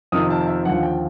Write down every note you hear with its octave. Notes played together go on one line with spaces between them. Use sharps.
F2 C3 D#3 D#6
A5
E5
D#2 D3 F3 F#5
G5